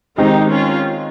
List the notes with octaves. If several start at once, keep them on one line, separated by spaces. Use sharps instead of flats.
D#3 G#3 C4 D#4 G4
C#4 F4